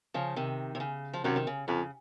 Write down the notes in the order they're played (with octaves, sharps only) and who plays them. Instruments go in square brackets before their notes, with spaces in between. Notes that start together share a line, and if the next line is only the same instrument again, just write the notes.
[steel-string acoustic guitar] C#3 F3
C3 D#3
C3
C#3
F3
[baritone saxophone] F#2 [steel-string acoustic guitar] C3 D#3
[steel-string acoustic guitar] D#3
C#3
[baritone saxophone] F2 [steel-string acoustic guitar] C#3